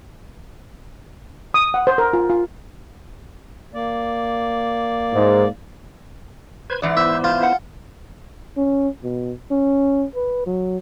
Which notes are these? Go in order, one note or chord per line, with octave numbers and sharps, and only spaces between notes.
D#6
F#5
C5
A#4
F4
F4
A#3 D5
G#2
B4 C5 G#6
G#2 E3 D5 F#5
B3 E4 C5 E5
F4
F#5
C#4
B2
C#4
B4
F#3